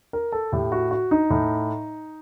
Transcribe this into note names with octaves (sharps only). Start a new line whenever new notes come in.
A#4
A4
A2 G4
F#4
F#4
D#4
A2